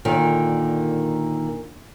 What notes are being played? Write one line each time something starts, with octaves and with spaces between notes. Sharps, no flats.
A#2 D3 D#3